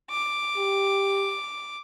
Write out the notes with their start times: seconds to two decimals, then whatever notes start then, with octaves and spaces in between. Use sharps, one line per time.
0.11 D6
0.58 G4